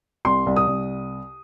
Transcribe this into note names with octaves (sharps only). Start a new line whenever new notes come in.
C2 C6
C2
D#6
C2